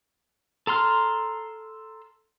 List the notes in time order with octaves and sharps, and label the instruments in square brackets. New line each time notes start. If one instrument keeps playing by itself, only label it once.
[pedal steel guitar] A4 A#5 C6 F6